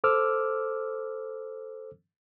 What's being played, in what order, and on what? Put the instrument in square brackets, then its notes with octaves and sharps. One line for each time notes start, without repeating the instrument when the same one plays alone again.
[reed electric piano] A4 C5 D6 E6 F6